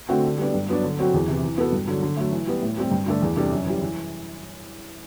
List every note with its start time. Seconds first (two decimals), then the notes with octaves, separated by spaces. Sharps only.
0.09 D3 A3 C4 F#4
0.25 D3
0.38 G3 B3 D4
0.54 G2
0.69 F#3 B3 D4
0.84 D3
0.99 F#3 C4 F#4
1.14 E2
1.28 C3 E3
1.43 E3
1.58 B3 F#4 A4
1.72 G2
1.88 D3 F#3
2.03 D3
2.17 F#3 A3
2.32 E3
2.47 G3 B3
2.62 A2
2.77 G3 C4 G4
2.91 G2
3.06 D3 A3 D4 A4
3.22 E2
3.36 C3 G3 D4 A4
3.52 F#2
3.66 E3 G3
3.81 E3